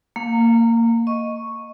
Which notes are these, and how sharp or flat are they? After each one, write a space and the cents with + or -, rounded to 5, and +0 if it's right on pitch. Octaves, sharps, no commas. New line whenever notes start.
A#3 -20 F5 +25
D#5 +0 C#6 +0